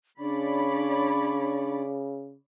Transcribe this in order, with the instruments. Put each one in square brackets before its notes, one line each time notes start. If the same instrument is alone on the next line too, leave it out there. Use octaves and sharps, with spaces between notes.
[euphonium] C#3 [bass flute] D4 [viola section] C#5 D5 B5